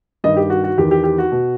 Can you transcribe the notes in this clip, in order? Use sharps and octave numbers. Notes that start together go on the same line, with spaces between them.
G2 D#3 D#5
G4
F#4
F#4
E2 D#3 G4
G4
G4
F#4
B2